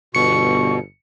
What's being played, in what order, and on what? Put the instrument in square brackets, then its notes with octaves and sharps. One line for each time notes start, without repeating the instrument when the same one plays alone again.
[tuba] G1 [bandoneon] B2 [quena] C#6 [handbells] C#7